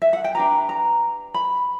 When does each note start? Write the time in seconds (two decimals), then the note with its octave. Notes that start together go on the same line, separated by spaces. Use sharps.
0.02 E5
0.13 F#5
0.24 G5
0.35 D4 G4 B4 A#5
0.69 A#5
1.34 B5